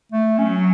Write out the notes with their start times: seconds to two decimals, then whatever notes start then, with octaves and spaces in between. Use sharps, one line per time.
0.12 A3
0.38 F#3 C#4